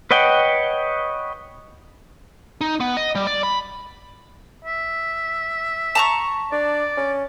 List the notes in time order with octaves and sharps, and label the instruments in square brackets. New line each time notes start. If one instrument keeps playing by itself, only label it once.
[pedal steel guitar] B4 C#5 D#5 F#5 G5
[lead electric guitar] D#4
B3
D#5
G3
D5
B5
[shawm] E5
[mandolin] A5 A#5 C#6
[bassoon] D4 [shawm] D5
[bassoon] C#4